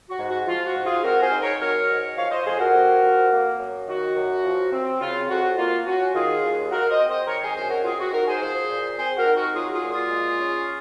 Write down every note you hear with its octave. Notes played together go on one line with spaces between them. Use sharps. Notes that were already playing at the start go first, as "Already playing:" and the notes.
F#4
G#2
F#4
F3 F4
F#4
G#2
F4 G#4
C4 F#4 A#4
G#4 C5
D#4
A#4 C#5
F#3 A#4 C#5
G#2
F3 C#5 F5
C5 D#5
F2 G#4 C5
F#4 A#4
C3
F2
A#3
F#2
D#3 F#4
F#2
F3
C4
C#3 F4
F2 F#4
A#3 F4
C#4 F#4
D#3 F4 G#4
D#2
G#3 F#4 A#4
C5 D#5
C4
C5 D#5
D#3 A#4 C#5
G#4 C5
F#2 G#4 C5
F#4 A#4
C4 F4 G#4
F#4
D#4 F#4 A#4
G#4 C5
F3 G#4 C5
A#2
C4 G#4 C5
F#4 A#4
D#4
F#4
F#3 F4 G#4
F4 G#4
A#2
F4 G#4
G#3
C#4